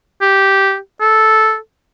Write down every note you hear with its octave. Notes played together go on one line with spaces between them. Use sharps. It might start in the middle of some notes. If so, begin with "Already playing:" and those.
G4
A4